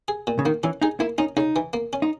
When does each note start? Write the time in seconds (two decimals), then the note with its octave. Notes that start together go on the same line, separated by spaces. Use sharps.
0.08 G#4
0.27 A#2
0.39 C#3
0.45 D#3 A#3
0.63 E3 C#4
0.82 D#4 G#4
1.00 A#3 E4
1.18 C#4 D#4
1.37 C#3 D#4
1.56 E3
1.73 A#3
1.93 C#4
2.02 D#4